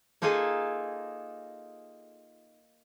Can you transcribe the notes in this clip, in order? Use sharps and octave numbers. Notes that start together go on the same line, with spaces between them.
A#3 D#4 F4 G#4 A4 G#5